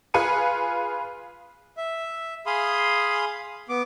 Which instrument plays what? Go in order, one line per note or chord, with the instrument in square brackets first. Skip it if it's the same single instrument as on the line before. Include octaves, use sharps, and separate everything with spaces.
[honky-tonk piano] F4 G#4 B4 G#5 C#7 D#7
[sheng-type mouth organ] E5
G#4 F5 B5 C6 D#6
B3 D6